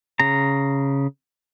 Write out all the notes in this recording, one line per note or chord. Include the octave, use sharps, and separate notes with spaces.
C#3 A#5